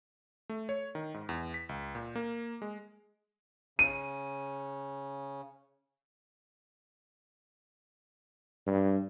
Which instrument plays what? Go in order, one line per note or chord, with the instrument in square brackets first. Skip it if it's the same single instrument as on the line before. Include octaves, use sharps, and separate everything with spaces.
[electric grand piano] A3
C#5
D#3
G#2
E2
B6
C#2
A#2
A#3
G#3
[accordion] C#3 [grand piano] D#7
[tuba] G2